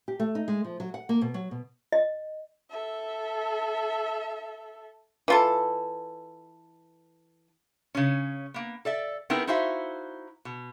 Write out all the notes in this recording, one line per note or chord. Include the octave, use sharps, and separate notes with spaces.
G4
A3
D#4
G#3
F3
F#3
F#5
A#3
B2
F#3
B2
D#5
A4 E5
E3 F4 A4
C#3 C#4
A#3 B3
A4 D5 E5
B3 C4 D#4 E4 G#4 A#4
D#4 E4 F#4 C5 E5 F5
B2